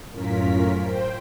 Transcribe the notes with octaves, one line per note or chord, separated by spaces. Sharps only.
F#2 A2 C#4 F4 A#4 B6
C5 G5